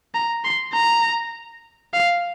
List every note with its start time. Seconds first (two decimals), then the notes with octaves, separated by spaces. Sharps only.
0.14 A#5
0.44 C6
0.74 A#5
1.94 F5